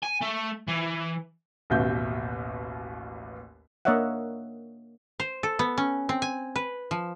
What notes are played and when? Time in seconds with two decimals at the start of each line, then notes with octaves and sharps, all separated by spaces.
0.03 G#5
0.22 A3
0.68 E3
1.70 A1 D#2 B2 E5 G6
3.85 A#3 D4 C#5 D#5 E5 F#5
5.20 C5
5.43 A4
5.59 B3
5.78 C#4
6.09 C4
6.22 G#5
6.56 B4
6.91 F3